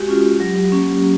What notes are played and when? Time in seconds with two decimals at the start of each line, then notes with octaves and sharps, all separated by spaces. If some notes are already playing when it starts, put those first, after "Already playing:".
Already playing: G#3 F#4 G4
0.08 C#4 F4
0.40 F#3
0.72 A#3 C#4